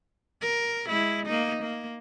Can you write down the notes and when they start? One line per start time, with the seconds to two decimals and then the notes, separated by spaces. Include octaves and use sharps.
0.42 A#4
0.88 G#3 E4
1.26 A#3 D#4
1.63 A#3